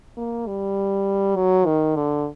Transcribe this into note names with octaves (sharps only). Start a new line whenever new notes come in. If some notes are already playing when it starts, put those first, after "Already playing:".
A#3
G3
F#3
D#3
D3